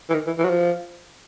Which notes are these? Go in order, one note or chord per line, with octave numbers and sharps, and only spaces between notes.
E3
D#3
E3
E3
F#3
F3